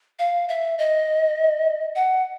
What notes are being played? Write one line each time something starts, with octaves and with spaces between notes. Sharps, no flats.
F5
E5
D#5
F#5